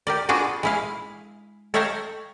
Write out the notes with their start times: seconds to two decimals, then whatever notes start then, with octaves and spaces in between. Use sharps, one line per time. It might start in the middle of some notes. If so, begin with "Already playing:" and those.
0.07 G4 A#4 D5
0.29 B3 D4 F4 F#4 G#4 D5
0.63 G#3 E4 F5
1.74 A4 C#5 E5 F5 G5 A#5